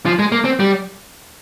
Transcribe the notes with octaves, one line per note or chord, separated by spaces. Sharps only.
F3
G#3
A#3
C4
G3